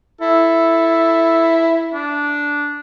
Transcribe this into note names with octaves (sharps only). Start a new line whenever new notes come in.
E4 A4
D4